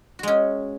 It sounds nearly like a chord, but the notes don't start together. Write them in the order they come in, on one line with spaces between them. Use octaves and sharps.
F#4 G#3 C#4